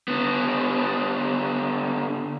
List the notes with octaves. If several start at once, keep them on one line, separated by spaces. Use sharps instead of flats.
D3 B3